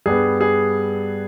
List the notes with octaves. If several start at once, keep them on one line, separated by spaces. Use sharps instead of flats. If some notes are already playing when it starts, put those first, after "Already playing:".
G2 G3 B3 G#4
G#4